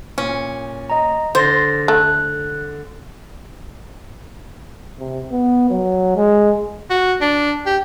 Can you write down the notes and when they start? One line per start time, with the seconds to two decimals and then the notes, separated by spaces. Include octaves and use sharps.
0.18 A#2 C#4
0.90 D#5 A#5
1.35 D3 C5 C6 A6 A#6
1.88 A3 F#6
4.99 C3
5.31 B3
5.70 F#3
6.16 G#3
6.90 F#4
7.21 D4
7.66 G4